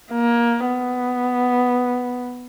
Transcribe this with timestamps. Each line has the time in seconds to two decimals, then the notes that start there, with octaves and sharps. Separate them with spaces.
0.12 A#3
0.67 B3